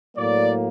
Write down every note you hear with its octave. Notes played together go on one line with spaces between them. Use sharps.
A2 F#3 A#3 D5